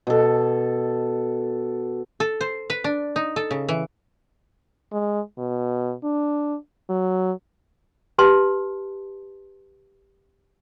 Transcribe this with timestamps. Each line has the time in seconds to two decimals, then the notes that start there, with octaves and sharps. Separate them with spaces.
0.07 B2 A4
2.20 A4
2.41 C5
2.70 B4
2.84 D4
3.16 D#4
3.36 A4
3.51 C#3
3.69 E3
4.92 G#3
5.38 B2
6.04 D4
6.89 F#3
8.18 G4 B4 A5 C6